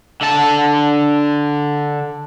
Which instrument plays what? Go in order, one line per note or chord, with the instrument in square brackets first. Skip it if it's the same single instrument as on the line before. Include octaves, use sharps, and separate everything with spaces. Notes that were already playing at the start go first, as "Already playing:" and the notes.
[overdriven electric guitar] D3 A5